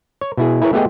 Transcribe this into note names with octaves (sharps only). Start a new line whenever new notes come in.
C#5
B2 E4 G#4
E4 G#4 A#4 B4 C#5
A3 B3 G4 G#4 D#5 G5